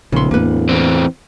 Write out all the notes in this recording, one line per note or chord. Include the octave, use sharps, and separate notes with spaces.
D1 A#1 C#3 C6
E2 A2 A#3 B4
E3 C4